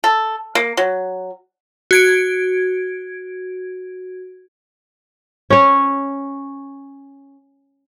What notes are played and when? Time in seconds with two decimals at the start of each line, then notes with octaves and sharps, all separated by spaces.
0.04 A4
0.55 A#3
0.77 F#3
1.91 F#4 G#6 D7
5.50 C#4 C#5